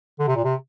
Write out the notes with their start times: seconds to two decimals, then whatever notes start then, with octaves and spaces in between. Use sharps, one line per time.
0.19 D3
0.28 C3
0.36 A#2
0.44 C3